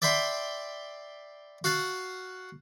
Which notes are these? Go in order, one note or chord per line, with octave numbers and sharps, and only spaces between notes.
D5 E5 G5 B5 C6
F#4 F5 F#5 A5